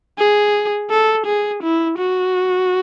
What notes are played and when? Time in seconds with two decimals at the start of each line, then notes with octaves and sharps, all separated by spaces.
0.19 G#4
0.90 A4
1.26 G#4
1.62 E4
1.98 F#4